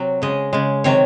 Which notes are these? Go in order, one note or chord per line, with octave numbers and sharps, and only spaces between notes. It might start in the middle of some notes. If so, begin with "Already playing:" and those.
Already playing: C3 F#3
C#3 G#3 D#5
C#3 G#3
C3 D#3 F#3 C#5